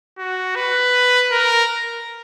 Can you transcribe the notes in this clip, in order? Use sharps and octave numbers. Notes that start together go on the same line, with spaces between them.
F#4
B4
A#4